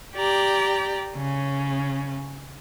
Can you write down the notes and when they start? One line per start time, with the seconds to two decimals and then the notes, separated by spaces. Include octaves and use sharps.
0.17 G4 D5 G5 A#5
1.16 C#3 C#4